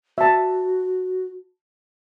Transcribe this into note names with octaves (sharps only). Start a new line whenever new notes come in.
F#4 E5 A5